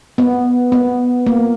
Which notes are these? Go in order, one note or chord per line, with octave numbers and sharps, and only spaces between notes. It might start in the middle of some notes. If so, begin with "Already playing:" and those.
B3
B3
A#3